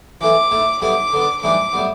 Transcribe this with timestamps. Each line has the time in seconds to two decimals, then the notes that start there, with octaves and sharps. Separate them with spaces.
0.21 E3 A3 E4 D6
0.51 A2 A3 E4
0.82 A2 G3 B3 E4 D6
1.13 D3 B3 D4
1.42 A2 E3 G3 D4 D6
1.73 A2 G3 B3